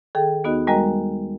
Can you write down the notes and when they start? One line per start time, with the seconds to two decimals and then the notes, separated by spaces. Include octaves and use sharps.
0.15 D#3 G#4 A4 G5
0.44 D#2 B3 D#4 F#4 D#5
0.67 G3 G#3 F#4 A#4 D#5 A#5